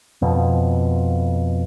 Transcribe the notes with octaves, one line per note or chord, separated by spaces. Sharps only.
F2 B2